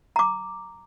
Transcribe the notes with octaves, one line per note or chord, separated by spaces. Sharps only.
A#5 D6